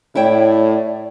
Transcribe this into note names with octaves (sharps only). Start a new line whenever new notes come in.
A2 E4 C#5 D5 G5